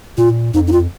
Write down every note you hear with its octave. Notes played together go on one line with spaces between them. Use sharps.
A#2 F4
F2 D#4
D#4
F4